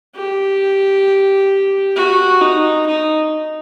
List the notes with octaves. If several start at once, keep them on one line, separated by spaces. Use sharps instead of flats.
G4
F#4
D#4
D#4